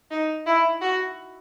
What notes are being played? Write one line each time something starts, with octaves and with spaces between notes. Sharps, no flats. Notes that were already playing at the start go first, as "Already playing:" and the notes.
D#4
E4
F#4